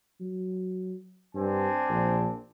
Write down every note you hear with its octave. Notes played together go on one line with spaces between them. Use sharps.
F#3
G2 C4 D4 G#5
A#1